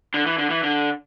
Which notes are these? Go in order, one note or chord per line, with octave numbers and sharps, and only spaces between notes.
D3
E3
D3
E3
D3